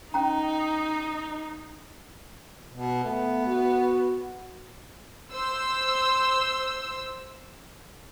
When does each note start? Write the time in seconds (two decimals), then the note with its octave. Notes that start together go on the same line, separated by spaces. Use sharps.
0.14 C#4 D#4 G5 A#5
2.72 B2
3.03 A3 B3
3.47 F#4
5.31 C5 E6